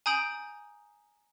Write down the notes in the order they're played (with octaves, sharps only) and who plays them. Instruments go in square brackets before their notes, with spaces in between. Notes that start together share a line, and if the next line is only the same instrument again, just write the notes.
[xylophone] G#5 A#5 D#6 G6 D7 F#7